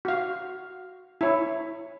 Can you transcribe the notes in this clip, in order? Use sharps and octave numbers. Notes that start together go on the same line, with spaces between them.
F#4 F5
E4 C#5